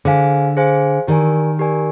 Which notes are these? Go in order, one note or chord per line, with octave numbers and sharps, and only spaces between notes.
D3 G#4 C5 F5 G#5
G#4 C5 F5 G#5
D#3 G4 A#4 D5 G#5
G4 A#4 D5 G#5